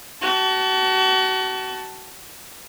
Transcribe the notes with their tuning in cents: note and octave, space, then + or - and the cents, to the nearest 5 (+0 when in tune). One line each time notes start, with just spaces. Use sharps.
F#4 +35 A5 +0